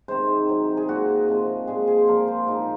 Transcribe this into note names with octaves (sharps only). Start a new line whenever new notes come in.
C3 D#3 G#3 C5
C3 F#3
G#4
A#2 G#3 F#4
C3 F3 G#3
A#2 G#3 G#4
G#4
C5
A#2 F3 G#3 A#4
C5
A#2 G#3 D#4